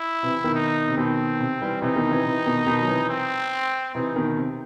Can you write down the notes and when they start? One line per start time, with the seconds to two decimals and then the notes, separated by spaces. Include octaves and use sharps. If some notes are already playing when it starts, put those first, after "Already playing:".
Already playing: E4
0.23 C3 E3
0.44 B2 D#3
0.55 D#4
0.88 C3
0.97 B2 D#3 C4
1.40 C3
1.62 E3 G3
1.82 C3 E3 D#4
1.96 B2 D#3
2.11 C3 E3
2.24 C3 E3
2.46 B2 D#3
2.67 B2 D#3
2.82 F#3
2.88 C3 E3
3.09 C4
3.95 C3 E3 D#4
4.16 B2 D#3
4.37 C3